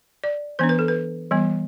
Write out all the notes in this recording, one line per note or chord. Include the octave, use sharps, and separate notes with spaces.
D5
E3 B3 D4 C5
B4
A4
B4
E3 G3 B3